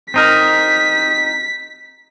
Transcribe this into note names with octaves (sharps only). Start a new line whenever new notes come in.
C4 D#4 A#4 B6